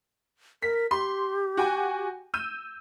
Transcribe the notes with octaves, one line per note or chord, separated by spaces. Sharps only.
A#4 B6
G4 C6
F#4 G5 G#5
E6 G6 D#7